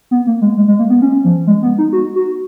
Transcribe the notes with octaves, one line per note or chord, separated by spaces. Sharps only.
B3
A#3
G#3
G#3
G#3
A#3
B3
C#4
F3
G#3
B3
D#4
F#4
F#4